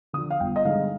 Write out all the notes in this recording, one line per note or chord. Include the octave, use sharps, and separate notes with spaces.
D3 F3 D#6
F5
G1 G5
D#5
G2 D3 G#3 D#4 F5